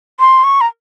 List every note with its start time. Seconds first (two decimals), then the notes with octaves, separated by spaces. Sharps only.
0.20 C6
0.44 C#6
0.61 A#5